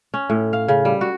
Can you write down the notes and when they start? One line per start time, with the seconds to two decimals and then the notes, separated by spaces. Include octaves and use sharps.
0.14 C#4
0.30 A2
0.53 F5
0.68 C#3
0.85 G3
1.01 F#4